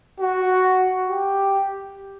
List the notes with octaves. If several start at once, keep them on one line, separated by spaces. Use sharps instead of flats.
F#4
G4